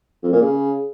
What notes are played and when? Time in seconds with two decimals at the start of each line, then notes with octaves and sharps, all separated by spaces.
0.23 F2
0.32 A#2
0.42 C#3